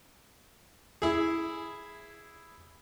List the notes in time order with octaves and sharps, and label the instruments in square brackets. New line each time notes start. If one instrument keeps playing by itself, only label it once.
[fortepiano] E4 G#4